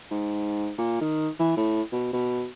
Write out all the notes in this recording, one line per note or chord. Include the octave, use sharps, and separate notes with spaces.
G#2
A#2
D#3
E3
A2
B2
B2